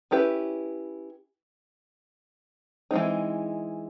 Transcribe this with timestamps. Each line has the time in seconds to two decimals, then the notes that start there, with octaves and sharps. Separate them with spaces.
0.11 C#4 E4 G4 B4
2.91 E3 G#3 C4 D#4